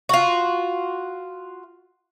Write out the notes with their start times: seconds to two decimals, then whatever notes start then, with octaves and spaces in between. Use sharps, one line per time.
0.09 F4 F#4